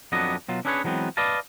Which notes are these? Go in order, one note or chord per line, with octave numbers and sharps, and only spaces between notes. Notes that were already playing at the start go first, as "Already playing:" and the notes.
F2 F#3 B3 D4 D#5
B2 F#3 F4
C#4 D4 E4 G#4 B4 C#5
E3 F#3 G#3 B3 C4
B4 D5 D#5 F5 A5